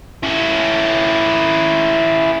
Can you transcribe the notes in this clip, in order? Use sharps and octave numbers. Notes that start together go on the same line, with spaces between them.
C#4 E4